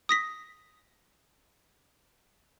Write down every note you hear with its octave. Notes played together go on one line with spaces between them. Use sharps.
D#6 A#6 B6